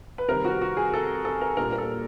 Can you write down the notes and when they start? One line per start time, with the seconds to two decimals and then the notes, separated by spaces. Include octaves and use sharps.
0.18 B4
0.29 C3 D#3 G3 C4 A#4
0.45 F#4
0.62 F#4
0.77 G#4
0.94 A4
1.25 A4
1.41 A#4
1.57 A#2 G3 A#3 D4 A#4
1.72 A#4
1.78 A4